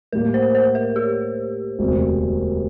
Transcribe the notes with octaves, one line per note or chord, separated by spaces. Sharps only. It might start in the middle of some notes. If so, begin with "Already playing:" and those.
A2 G3 A#3 A#4
C5
C5
A#4
G4
E1 D2 C3